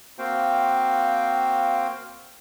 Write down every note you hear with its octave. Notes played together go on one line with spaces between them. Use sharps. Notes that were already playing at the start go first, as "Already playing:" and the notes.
A#3 C4 F#4 C5 F5 G5